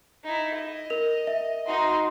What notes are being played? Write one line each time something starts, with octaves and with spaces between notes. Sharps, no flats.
D#4 E4
D#5
A#4 F7
E5
D#4 F#4 C6